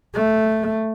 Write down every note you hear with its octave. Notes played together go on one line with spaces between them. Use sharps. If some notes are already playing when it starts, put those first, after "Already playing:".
A3